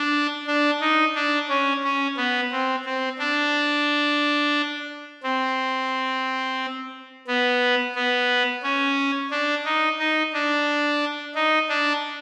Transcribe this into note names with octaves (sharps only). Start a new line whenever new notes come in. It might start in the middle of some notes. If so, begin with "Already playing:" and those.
Already playing: D4
D4
D#4
D4
C#4
C#4
B3
C4
C4
D4
C4
B3
B3
C#4
D4
D#4
D#4
D4
D#4
D4